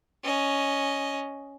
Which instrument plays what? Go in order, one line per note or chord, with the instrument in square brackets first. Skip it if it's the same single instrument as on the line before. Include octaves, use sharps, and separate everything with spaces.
[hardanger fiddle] C#4 D#5